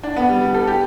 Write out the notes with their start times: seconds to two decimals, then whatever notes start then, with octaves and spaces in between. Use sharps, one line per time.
0.03 D4
0.16 B3
0.29 G3
0.41 G3
0.54 A4
0.67 G4